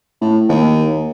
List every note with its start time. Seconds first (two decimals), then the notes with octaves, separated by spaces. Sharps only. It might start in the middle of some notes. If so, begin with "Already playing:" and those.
0.21 A2
0.49 D#2